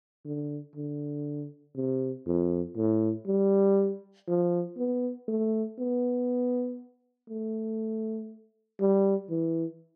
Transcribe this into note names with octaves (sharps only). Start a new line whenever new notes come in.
D3
D3
C3
F2
A2
G3
F3
B3
A3
B3
A3
G3
E3